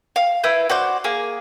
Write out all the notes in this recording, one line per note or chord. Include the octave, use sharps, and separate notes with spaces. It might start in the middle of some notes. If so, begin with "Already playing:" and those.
F5
E4 B4 G6
F#4 C5 D5 G6
A#3 G#4